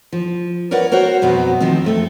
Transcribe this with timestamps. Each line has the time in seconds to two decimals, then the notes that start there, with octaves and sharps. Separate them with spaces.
0.12 F3
0.71 A#4 B4 C#5 D5 F#5
0.92 F#4 A#4 C5 C#5 F#5
1.22 F2 B2 F#3 B3 F#4
1.60 D#3 F3 A3 C4
1.84 F2 A3 A4